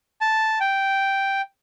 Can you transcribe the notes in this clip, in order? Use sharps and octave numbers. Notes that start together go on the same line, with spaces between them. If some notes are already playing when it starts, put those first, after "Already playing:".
A5
G5